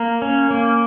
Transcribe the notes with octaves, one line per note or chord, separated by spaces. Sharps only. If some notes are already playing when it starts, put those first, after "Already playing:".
Already playing: A#3 A#5
C#4
A#3